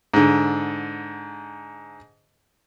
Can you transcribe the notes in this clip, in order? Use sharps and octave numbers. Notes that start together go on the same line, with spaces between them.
G#2 D3